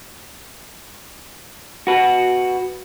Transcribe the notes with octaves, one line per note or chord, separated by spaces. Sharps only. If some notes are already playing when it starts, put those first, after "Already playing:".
F#4 B4